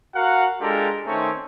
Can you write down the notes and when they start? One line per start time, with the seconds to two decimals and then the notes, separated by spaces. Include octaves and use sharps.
0.15 F#4 A#4 F5 F#5
0.60 G#3 D4 F4 G4 A4 A#4
1.06 D#3 A3 C4 C#4 D#4 C#5